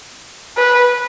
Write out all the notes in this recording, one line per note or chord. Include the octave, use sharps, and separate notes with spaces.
B4